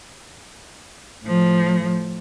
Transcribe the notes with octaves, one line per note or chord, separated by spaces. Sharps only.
A2 F3